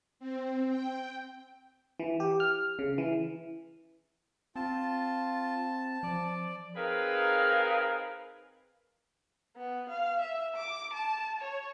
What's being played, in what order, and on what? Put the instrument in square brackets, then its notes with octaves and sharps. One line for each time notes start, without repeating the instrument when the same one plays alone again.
[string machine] C4
G5
[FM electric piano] E3
G4
F6
C#3
E3
[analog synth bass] C4 [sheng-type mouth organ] F4 [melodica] A5
[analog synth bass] F3 [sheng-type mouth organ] D5
[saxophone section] C4 D#4 G#4 A#4 B4 F5
[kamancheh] B3
F5
E5
D6
A5
C#5